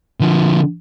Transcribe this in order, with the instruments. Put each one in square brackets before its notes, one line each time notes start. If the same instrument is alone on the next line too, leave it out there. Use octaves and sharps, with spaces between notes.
[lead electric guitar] D3 F3